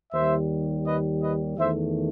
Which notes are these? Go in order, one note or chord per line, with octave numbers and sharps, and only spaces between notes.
D#2 D#3 G3 C5 E5
B4 D#5
B4 D#5
E2 D#3 A3 C5 E5